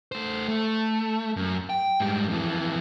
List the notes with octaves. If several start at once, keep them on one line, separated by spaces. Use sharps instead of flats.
A3 C5
A3
F#2
G5
G#2 G3
F2 E3